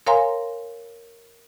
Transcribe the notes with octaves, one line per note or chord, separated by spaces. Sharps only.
A#4 C#5 F5 G#5 A#5 C6